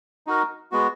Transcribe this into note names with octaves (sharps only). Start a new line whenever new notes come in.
D#4 F#4 A#4
G#3 B3 F#4